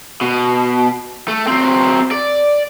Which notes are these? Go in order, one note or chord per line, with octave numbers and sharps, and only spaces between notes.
B2
A3
F#3 C4
D5